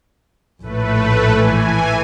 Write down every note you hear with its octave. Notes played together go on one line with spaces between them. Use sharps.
A#1 A2 A3 B4
E3 G#5